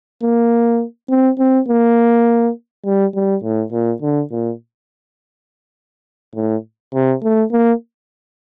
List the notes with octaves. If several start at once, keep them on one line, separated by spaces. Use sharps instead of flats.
A#3
C4
C4
A#3
G3
G3
A2
A#2
D3
A#2
A2
C3
A3
A#3